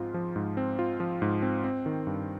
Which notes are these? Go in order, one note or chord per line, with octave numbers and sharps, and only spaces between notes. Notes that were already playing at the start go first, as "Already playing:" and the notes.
Already playing: G#2 F3 C4 F4
F3
G#2
C4
F4
F3
G#2
C4
C4
D#3
G2